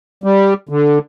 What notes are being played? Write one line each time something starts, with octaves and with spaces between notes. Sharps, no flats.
G3
D3